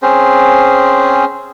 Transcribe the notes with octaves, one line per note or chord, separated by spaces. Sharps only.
C4 C#4 G#4 C5